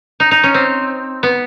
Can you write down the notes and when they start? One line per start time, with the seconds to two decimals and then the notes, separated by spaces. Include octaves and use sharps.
0.20 D#4
0.31 D#4
0.44 C#4
0.54 C4
1.23 B3